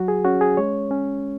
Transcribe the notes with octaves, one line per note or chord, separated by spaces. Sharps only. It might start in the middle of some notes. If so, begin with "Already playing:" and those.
Already playing: F#3 F#4
G#4
C#4 F#4
G#4
G#3 C#5
C#4